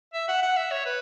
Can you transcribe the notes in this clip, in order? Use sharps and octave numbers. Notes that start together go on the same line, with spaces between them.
E5
F#5
F#5
E5
C#5
B4